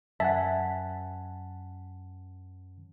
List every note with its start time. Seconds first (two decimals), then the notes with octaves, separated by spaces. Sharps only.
0.20 F#2 E5 F#5 G#5 A5